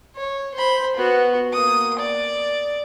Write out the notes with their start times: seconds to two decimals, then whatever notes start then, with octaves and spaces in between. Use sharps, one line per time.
0.16 C#5
0.54 C5 B5
0.96 B3 F#4
1.53 A#3 D#6
1.99 D5